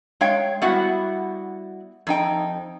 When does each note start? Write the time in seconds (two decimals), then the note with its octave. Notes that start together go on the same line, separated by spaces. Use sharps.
0.21 G#3 C#5 F5 G5
0.62 G3 B3 E4 F#4 F#5
2.07 F2 D#4 G5